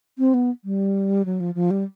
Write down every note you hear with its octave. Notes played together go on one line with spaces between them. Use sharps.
C4
B3
G3
F#3
F3
F3
G3